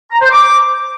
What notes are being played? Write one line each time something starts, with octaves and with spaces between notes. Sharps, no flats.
A#5
C5
D6